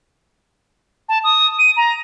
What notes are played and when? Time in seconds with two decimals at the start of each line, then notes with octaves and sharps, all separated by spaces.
1.09 A5
1.24 D#6
1.59 D#7
1.77 A#5